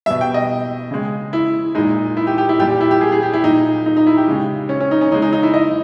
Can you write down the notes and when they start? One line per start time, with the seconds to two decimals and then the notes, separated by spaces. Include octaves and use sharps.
0.06 B2 G3 E5
0.21 G5
0.34 D#5
0.91 C#3 G#3
1.33 E4
1.75 A#2 G#3 D#4
2.17 E4
2.27 G4
2.38 G4
2.49 E4
2.59 A#2 G3 G4
2.69 G4
2.81 E4
2.91 G4
3.01 G#4
3.12 G#4
3.23 G4
3.33 E4
3.43 A#2 G3 D#4
3.86 D#4
3.97 D#4
4.07 E4
4.17 G4
4.27 C#3 G#3
4.69 C#4
4.81 C#4
4.91 D#4
5.01 C#4
5.12 C#3 G#3 D#4
5.22 D#4
5.33 D#4
5.43 E4
5.54 D#5